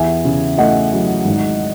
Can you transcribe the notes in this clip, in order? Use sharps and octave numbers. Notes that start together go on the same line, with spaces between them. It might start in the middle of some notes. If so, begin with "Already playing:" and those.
Already playing: E2 E5 G#5
C#3
A3 D#5 F#5
F#3
G#1